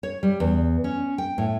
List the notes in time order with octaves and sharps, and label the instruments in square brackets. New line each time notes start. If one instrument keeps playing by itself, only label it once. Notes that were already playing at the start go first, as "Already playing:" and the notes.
[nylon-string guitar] C#5
G3
E2
C#4
G5
A2